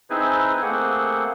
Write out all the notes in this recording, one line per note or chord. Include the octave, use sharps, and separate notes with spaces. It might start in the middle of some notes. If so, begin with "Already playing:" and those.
C4 D#4 E4 G#4 B4 G#5
A3 A#3 C4 G#4 F#5